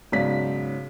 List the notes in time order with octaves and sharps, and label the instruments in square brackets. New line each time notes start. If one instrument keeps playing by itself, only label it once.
[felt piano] B1 G#2 C#3 D5 B6